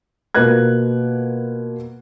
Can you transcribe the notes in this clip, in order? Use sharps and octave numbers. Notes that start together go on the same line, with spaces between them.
B2 A#3 F4 B4 F#6 G#6